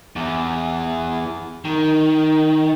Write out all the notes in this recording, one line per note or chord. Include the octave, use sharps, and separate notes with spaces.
E2
D#3